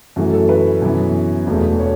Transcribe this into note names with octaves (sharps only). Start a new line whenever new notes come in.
F#2 E3 A3 F#4
A4
B4
F#2 E3 B3
E1 E2 B2 A3
C#5